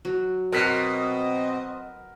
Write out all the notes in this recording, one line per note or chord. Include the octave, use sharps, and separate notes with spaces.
F#3
B2 C4 A#4 D#5 F#6 B6